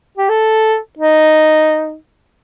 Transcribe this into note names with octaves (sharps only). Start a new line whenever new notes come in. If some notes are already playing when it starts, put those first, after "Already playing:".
G4
A4
D#4